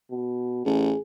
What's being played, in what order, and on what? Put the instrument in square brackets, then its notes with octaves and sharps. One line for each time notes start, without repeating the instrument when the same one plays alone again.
[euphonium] B2
[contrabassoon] A1 [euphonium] G#4